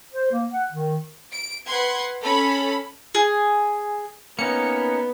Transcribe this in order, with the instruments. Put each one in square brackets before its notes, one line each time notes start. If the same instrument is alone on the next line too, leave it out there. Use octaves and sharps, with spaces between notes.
[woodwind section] C5
A#3
F#5
D#3
[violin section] D7
B4 F#5 C6 G#6
C#4 A4 B5
[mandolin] G#4
[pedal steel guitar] A#3 C#4 D#4 [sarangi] B3 [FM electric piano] C#7